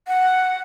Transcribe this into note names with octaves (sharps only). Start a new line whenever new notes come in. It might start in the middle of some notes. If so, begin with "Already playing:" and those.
F#5